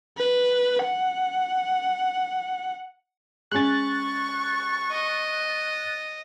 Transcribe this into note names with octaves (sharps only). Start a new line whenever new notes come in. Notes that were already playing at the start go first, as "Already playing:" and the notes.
B4
F#5
G#3 C#4 C#6 F#6 A6
D#5